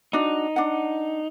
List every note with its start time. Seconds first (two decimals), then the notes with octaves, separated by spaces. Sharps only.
0.13 D4 D#4 F#4
0.56 D4 F#5